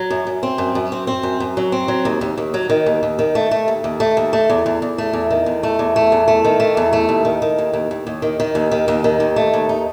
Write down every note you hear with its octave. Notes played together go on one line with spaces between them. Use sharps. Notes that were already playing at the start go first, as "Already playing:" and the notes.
Already playing: F#3
F#2
F#2
C4
F#2
F#2
C4
C4
F#2
F#2
F#3
C4
F#3
D#2
D#2
D#2
F#3
D#3
D#2
D#2
D#3
A3
A3
D#2
D#2
A3
D#2
A3
E2
E2
E2
A3
E2
D#3
E2
A3
E2
A3
E2
A3
D#3
A3
E2
A3
D#2
D#3
D#3
D#2
D#2
D#2
D#2
D#3
D#3
D#2
D#3
D#2
D#3
D#2
A3
D#2
D#4